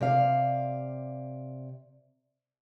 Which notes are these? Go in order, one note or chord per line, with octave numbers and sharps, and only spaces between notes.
C3 D5 F5